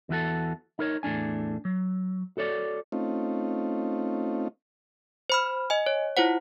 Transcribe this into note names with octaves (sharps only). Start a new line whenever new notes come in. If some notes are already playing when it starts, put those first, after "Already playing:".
E2 E3 F#4 A4
D#4 A#4 C#5
E2 A2 C#4 D4 G#5
F#3
F#4 A4 C#5 D5
A3 C4 C#4 D#4 F4
C5 B5 F6
D#5 G#5
C#5
E4 F4 C5 F#5